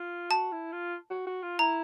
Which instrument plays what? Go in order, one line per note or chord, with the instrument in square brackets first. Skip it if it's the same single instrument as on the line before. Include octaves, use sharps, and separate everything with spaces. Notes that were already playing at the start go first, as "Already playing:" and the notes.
Already playing: [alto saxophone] F4
[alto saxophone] F#4 [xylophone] A5
[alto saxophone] E4
F4
F#4
F#4
F4
[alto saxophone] E4 [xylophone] A#5